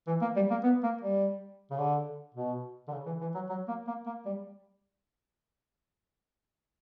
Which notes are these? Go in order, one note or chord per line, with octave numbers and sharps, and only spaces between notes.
E3
A#3
G3
A#3
B3
A#3
G3
C#3
D3
B2
D3
C#3
E3
E3
F#3
F#3
A#3
A#3
A#3
G3